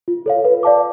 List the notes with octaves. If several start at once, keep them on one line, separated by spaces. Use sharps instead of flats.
F4
A4 C#5 F5
B4
D5 F5 A5 D6